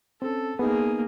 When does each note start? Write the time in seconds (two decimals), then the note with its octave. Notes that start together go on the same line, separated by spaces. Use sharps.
0.22 C4 C#4 A4
0.59 A#3 B3 D#4 G#4